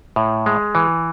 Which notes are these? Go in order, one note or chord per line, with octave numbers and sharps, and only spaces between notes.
A2
G#3
E3